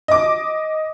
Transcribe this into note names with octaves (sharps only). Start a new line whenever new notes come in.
D#5 D6